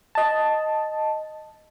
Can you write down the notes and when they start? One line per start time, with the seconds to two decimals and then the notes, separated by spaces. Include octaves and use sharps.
0.15 D#5 A5